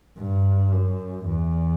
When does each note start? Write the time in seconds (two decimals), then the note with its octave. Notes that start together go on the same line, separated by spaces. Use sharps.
0.18 G2
0.72 F#2
1.27 E2